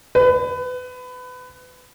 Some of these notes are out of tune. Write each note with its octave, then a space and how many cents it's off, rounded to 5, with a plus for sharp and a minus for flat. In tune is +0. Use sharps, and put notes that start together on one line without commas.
B4 +25